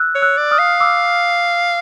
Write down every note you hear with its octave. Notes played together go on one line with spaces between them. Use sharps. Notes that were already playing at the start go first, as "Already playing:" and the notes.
Already playing: E6 F#6
C#5
E6 F#6
D5
D#6 F6
F5
D6 E6